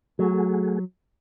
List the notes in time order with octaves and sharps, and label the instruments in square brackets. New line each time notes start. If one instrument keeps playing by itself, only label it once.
[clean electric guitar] F#3 [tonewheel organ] A3 F#4 G#4